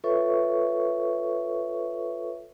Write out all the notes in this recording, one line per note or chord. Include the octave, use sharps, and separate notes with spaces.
F4 A4 B4 C#5 E5 C#6